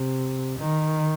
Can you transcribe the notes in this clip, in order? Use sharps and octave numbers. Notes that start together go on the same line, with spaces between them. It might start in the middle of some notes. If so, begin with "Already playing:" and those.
Already playing: C3
D#3